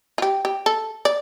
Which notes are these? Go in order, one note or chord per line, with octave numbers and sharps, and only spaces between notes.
F4
G4
G4
A4
D5